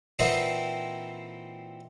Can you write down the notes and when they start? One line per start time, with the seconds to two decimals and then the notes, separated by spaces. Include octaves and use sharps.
0.19 A#2 E3 C4 D#4 E4 F#4